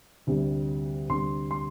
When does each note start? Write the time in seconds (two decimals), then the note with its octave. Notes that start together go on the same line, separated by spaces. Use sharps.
0.27 D2 C3 G3
1.09 D2 C3 G3 C6
1.51 C6